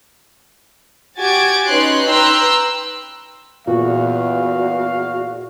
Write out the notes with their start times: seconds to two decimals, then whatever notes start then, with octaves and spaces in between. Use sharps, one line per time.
1.19 F#4 G4 G#5 G#6 A6 D7
1.67 C#4 D#4 B4 C#5 C6 F#6
2.09 B4 G5 A#5 C6 E6 F#6
3.67 E2 A#2 F#4 F5